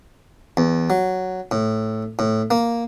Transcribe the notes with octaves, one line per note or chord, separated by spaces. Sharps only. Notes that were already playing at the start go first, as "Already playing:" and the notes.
E2
F#3
A2
A2
A#3